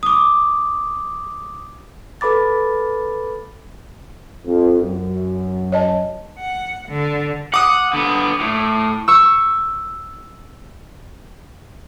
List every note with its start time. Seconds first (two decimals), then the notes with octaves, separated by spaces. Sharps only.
0.03 D6 D#6
2.21 A4 B4 B5 D6 A6
4.46 F2
4.80 F#2
5.72 C#5 D#5 A5
6.39 F#5
6.89 D3
7.54 F#5 D6 D#6
7.93 D3 B3
8.40 A2
9.08 C#6 E6